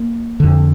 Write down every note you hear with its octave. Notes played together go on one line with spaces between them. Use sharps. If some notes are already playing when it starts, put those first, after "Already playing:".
Already playing: A#3
F2 D3